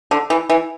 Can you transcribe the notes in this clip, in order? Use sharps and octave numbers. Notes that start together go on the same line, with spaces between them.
D3
E3
E3